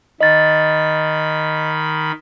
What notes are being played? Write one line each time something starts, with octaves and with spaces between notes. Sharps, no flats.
D#3 D#5 B5 A6